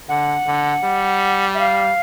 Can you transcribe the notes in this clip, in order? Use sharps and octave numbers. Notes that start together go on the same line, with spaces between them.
D3 F#5
D3
G3
E5
F5